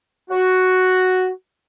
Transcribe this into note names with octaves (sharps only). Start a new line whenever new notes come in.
F#4